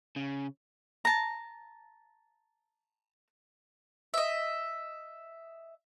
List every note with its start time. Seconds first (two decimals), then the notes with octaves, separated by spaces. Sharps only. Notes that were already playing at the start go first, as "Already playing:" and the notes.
0.16 C#3
1.05 A5 A#5
4.14 D#5 E5